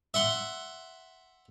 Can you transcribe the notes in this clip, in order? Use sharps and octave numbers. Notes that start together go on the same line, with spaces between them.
E5 F#5 C6